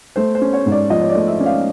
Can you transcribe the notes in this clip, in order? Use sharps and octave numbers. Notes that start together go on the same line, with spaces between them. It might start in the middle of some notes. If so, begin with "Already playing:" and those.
A3 C5
C5
C#4
C#5
G#2
D5
F3 D#5
C#5
D5
A3
E5
C#4
F5